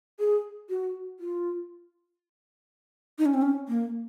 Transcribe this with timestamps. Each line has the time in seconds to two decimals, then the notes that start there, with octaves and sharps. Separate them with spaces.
0.19 G#4
0.70 F#4
1.20 F4
3.19 D#4
3.26 C#4
3.34 C4
3.42 C#4
3.68 A#3